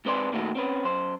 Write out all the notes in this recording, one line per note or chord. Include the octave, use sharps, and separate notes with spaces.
G#2 C4 B4 D5 C6
A#2 D#3 A3 E4 F#4
C4 C#4 B4
F#2 C5